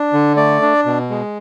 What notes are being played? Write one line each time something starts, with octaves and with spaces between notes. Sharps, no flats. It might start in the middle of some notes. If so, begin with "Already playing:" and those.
Already playing: D4
D3
A3 D5
D4
B2
G#3